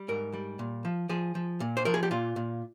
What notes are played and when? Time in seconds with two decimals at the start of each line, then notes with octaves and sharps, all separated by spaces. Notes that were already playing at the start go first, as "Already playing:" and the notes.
Already playing: G3
0.08 G#2 A#4
0.33 G3
0.59 A#2
0.85 F3
1.09 F3 G#4
1.35 F3
1.60 A#2
1.77 C5
1.85 F3 A#4
1.94 G#4
2.03 G4
2.11 A#2 F4
2.36 A#2